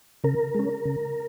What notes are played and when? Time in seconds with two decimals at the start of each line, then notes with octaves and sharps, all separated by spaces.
0.24 C#3 A#4
0.54 G#3 C#4
0.85 C#3